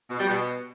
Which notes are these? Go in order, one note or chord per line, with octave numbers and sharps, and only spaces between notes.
B2
G3
B2